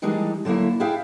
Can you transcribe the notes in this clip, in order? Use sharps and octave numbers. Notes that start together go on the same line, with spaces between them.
D#3 E3 G3 G#3 D4 D#4
D3 F#3 A3 A#3 E4
D4 E4 G#4 E5 F5 G5